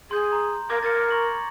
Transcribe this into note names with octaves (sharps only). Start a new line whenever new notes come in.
G#4 C6 G6
A#5 C6
A#4 D6 G#6 A#6
A#4 A6 C#7
A#5 C#6 F#7